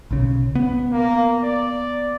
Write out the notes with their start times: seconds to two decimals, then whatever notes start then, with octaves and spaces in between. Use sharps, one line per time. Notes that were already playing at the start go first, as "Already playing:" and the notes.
0.11 B1 C#3
0.55 B3
0.93 A#3
1.44 D5